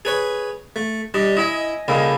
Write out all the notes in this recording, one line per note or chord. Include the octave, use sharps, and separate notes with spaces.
G#4 B4 C#5
A3
G3 D4 D#5
E4 D#5 E5 G#5
C#2 C#3 G3 A#3 A4 D#5